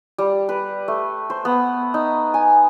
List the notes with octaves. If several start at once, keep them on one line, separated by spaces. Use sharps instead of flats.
G3
B4
A3
C5
B3
D#4
G#5